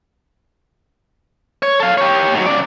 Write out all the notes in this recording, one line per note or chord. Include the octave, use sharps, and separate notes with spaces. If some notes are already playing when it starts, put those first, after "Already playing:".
C#5
A4 F5
G4 C#5
G#2 F#3
C#3 D5